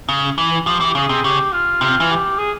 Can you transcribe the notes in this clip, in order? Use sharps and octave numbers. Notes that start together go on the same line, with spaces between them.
C#3
E3
F3 G4
E3
G4
C#3 G#4
C3
C#3 G4
F4
C3 F4
E3
G4
G#4